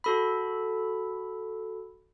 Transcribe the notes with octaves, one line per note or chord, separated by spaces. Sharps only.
F#4 A4 B5